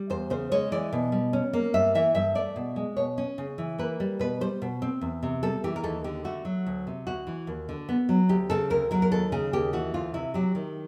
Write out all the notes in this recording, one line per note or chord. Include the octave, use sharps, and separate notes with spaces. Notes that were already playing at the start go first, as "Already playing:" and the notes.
Already playing: G3
E2 C5
C#3 C5
G#3 C#5
E3 D5
B2
G3
C#4
A#3
G2 E5
E3 E5
G2 E5
A3 D5
B2
G#3
B2 C#5
C#4
C#3
E3
A#3 B4
G3
B2 B4
G3 C5
B2
C4
E2
C3
G3 A4
E3 G4
A#4
D#2 A4
D3 G4
A3 F#4
F#3
D2
C3
D2 F#4
E3
D#2
D3
B3
F#3
D2 G4
C#3 A4
D2 A#4
F#3 A#4
A#4
D#2 A4
C#3 G#4
D#2 G4
E3 F#4
D2 F4
C3 E4
F#3 G4
D#3